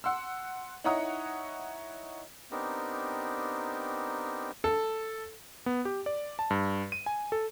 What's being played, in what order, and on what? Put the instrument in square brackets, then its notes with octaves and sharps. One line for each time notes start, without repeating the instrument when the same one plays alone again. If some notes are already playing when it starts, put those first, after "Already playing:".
[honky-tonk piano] F#5 C6 E6
D#4 E4 C#5 F#5 A#5 D#6
[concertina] B3 C4 D4 D#4 G4 A#4
[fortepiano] A4
[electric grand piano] B3
G4
D5
A5
G2
D#7
G#5
A4